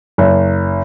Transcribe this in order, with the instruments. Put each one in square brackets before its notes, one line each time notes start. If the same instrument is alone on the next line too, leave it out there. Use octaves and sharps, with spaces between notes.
[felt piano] F#1